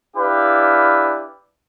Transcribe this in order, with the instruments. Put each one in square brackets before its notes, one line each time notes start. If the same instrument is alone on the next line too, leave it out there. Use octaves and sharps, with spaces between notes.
[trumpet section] D4 E4 G4 B4 F5